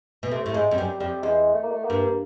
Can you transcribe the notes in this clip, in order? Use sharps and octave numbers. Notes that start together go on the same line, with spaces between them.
B2
C3 A3
A2
G#2 G#3
F2
F#2 G3
F2 G3
E2 G#3
A3
A#3
A3
A#3
G2